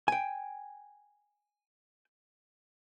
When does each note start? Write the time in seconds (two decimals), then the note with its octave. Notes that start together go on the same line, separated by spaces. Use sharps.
0.08 G5 G#5